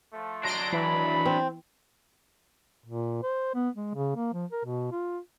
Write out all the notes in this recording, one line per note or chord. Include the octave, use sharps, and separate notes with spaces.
F3 A3
F#3 D4 C6 A#6 D7
E3 B5
C4
A#2
C5
B3
G#3
C#3
A#3
F3
A#4
B2
F4